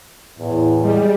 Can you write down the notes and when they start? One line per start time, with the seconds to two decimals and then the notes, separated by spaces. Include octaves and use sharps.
0.39 E2 A2
0.82 G3 G#3